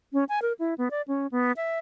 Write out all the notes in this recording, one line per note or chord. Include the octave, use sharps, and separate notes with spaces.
C#4
G#5
A#4
E4
B3
D5
C#4
B3
E5